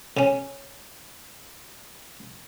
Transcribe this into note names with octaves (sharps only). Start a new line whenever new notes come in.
C#3 C#4